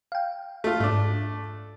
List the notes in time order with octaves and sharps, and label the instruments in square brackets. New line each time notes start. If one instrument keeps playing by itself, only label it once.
[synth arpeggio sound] F5 G5
[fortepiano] A3 F4
[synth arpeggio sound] G#2 [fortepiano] A3 D4